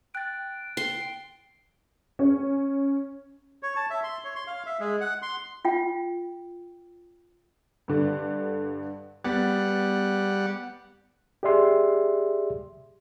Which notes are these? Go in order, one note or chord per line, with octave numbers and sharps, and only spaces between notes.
G5 F#6 A6
C6
C#4
C#5
A5
E5
C6
C#5
C6
F5
E5
G#3
F#5
C6
F4 G5
G2 D3
G3 B3 F#5 A6
G4 G#4 D5 E5 C6